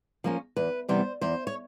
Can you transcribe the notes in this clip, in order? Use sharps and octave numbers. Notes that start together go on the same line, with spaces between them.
F3 A#3 C#4
E2 B4
C3 E3 G3 B3 C5
E2 C5
C#5